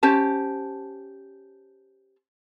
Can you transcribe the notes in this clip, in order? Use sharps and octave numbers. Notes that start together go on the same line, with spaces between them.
C#4 G4 C5 A5